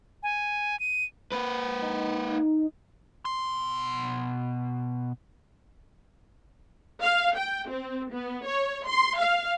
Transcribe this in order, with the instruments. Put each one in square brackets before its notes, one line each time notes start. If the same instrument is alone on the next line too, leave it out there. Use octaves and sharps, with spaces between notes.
[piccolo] G#5
D#7
[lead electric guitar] A#3 B4
[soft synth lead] D#4
[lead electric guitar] B2 C6
[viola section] F5
G5
C4
B3
C#5
C6
F5